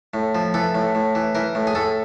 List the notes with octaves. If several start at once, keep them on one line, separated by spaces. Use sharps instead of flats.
A2
F3
E3 A4
A2
A2
E3
E3 A#4
A2
G#4
A2 A4